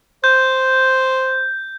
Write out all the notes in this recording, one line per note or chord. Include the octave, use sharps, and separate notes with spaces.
C5 G6